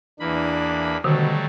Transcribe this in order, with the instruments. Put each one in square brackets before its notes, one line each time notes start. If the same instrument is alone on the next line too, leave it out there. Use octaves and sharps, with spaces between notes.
[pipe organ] E2 A#3 B5 [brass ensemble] E3 D4
[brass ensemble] B2 [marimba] D3 D#3 [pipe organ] F#3 G3 A3